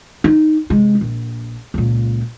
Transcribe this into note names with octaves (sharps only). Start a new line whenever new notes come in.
D#4
C3 G#3
A#1
C#2 A#2